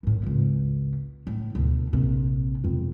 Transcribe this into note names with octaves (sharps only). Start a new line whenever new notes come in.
D#2 A2
G#1 C#2
A2
D2 B2
A#1 C3
E1 F2